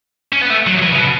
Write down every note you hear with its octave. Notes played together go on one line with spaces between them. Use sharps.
C#4
B3
A3
F#3
E3
C#3
B2